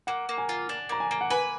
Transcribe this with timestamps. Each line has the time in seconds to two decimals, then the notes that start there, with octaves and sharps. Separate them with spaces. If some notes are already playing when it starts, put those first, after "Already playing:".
0.07 A#3 F#5
0.29 A#3
0.38 G#5
0.49 F4
0.69 D4
0.89 A#3 A#5
1.00 G#5
1.11 A#3
1.21 F#5
1.30 B4 G#5